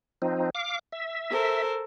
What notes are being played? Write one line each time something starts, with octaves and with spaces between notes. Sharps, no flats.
F3 C4 D#4
F5 D6
E5
A4 A#4 C5